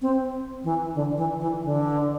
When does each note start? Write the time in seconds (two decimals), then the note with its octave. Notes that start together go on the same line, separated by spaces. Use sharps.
0.02 C4
0.64 E3
0.95 D3
1.17 E3
1.40 E3
1.64 D3